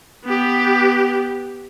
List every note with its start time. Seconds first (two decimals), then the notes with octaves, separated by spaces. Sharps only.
0.24 B3 G4